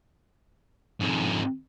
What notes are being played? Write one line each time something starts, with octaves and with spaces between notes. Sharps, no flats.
F2 G#2